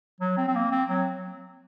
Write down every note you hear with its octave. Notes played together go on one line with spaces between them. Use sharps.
F#3
C4
C4
A#3
C4
F#3